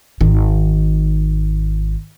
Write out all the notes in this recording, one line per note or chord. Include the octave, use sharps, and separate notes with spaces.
G#1 D#3